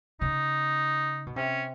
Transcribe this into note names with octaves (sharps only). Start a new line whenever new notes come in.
C#3 D#4
B2
C3 C#4